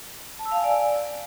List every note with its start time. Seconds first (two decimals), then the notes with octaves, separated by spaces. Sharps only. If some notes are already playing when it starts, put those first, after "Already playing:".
0.39 A5
0.45 E6
0.52 F5
0.58 G#5
0.64 D5